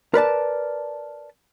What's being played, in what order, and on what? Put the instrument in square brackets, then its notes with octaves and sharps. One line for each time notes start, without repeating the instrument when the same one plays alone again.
[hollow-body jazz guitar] A#4 B4 D5 A5